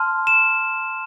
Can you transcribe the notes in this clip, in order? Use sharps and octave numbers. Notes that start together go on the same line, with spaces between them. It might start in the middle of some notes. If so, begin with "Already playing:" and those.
Already playing: A5 C6 F6
E7